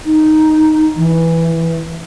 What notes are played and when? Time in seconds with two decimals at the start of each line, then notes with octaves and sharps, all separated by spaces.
0.06 D#4
0.96 E3